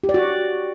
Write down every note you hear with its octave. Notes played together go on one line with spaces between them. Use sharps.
G4
D5
F#4